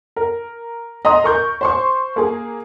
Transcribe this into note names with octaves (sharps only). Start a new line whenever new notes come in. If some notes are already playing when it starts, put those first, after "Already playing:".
A#4
D#5 A#5 C6 D#6
A#4 C#6 G6
C5 C6 C#6
A#3 G#4